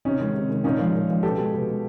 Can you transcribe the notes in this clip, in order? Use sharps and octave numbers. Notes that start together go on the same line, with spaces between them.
C3 C#4 D#4
D#3 G#3
C3
D#3 G#3
A#2 C#4 D#4
F3 G#3
A#2
F3 G#3
B2 G4 A4
G#3
B2
G#3